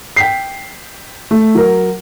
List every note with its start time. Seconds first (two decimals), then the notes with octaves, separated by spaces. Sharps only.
0.16 G5 B6 C7
1.31 A3
1.55 F#3 A#4